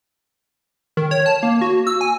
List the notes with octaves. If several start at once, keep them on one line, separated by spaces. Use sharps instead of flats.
D#3
C#5
A5
A#3
F#4
E6
G#5